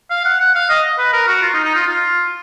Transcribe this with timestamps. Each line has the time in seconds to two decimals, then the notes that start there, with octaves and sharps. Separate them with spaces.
0.10 F5
0.25 F#5
0.40 F#5
0.55 F5
0.69 D#5
0.98 B4
1.13 A#4
1.27 F#4
1.42 F4
1.54 D#4
1.64 D#4
1.75 F4
1.87 F4